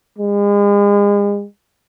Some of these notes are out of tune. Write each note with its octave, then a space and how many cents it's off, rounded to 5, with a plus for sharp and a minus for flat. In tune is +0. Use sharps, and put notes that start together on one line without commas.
G#3 -40